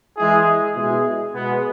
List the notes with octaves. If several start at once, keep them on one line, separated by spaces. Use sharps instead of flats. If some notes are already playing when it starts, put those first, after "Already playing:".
E3 G#3 E4 G#4
B2 G#3 E4 G#4
B2 G#3 B3